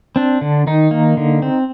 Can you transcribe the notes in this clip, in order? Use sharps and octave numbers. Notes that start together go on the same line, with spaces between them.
C4 D4
D3
D#3 D#4
A#3
D3
C4